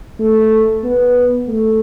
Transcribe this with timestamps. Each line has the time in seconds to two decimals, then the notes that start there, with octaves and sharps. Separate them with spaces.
0.19 A3
0.84 B3
1.48 A3